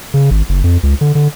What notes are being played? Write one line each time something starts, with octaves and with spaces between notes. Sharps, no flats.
C#3
G#1
F#1
F2
C#2
D3
D3